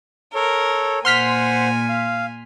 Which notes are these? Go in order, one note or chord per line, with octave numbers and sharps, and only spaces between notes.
A4 A#4 C#5
A#2 C5 F#5 G#5 C6 F6 B6
F5